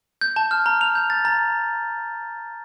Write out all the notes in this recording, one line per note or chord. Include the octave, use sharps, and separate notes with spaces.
G6
A5
F6
A#5
F7
G6
A6
A#5